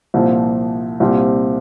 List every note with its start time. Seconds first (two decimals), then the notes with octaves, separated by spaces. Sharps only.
0.14 C2 A#2 F3
1.00 C2 A#2 G3 C4 F4